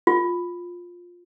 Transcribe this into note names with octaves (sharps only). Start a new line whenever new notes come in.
F4